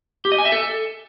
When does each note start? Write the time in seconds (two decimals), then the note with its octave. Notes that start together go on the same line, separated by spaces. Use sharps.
0.25 G4
0.32 D#5
0.38 G#5
0.45 E5
0.52 A4